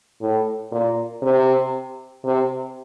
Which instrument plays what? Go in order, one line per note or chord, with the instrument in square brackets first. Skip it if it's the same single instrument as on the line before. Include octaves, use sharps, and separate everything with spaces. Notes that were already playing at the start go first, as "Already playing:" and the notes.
[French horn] A2
A#2
C3
C3